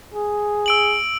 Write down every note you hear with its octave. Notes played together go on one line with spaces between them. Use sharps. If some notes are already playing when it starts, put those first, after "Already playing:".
G#4
E6 D7 F#7